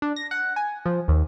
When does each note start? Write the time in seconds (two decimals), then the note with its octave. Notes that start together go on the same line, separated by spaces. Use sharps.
0.02 D4
0.16 A#6
0.31 F#5
0.56 G#5
0.86 F3
1.08 D#2